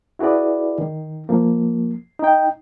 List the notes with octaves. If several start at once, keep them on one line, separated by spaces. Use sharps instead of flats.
E4 F#4 G#4 B4 D5
D#3
F3 A#3
D#4 G5